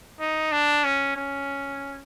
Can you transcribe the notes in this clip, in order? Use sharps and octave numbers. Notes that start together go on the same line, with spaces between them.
D#4
D4
C#4
C#4